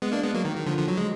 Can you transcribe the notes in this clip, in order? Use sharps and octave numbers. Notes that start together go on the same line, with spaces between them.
G#3 B3
A#3 D4
G#3 B3
F#3 A#3
D#3
D#3
D3 F3
D3 F3
F#3
G#3